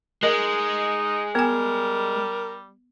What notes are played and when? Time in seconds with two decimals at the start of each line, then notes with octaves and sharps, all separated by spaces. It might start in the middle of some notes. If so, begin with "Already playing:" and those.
0.23 G#3 D#4 A#4 D#5
1.35 G3 B3 A#4 G#5